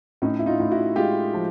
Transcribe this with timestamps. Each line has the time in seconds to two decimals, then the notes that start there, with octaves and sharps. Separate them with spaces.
0.22 A2 C#4 D#4
0.39 E4
0.46 D#4 F4
0.60 A2
0.71 E4 F#4
0.96 G#3 F4 G4
1.34 F3